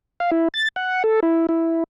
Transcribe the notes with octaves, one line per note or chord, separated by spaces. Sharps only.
F5
E4
A6
F#5
A4
E4
E4